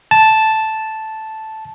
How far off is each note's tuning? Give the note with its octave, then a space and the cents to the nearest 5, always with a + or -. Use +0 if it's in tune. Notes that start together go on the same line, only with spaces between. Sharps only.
A5 -5